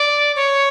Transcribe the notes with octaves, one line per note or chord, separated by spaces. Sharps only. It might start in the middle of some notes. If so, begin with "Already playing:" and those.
Already playing: D5
C#5